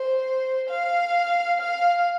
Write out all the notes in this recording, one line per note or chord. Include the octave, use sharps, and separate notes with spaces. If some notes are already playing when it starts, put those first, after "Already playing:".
Already playing: C5
F5
F5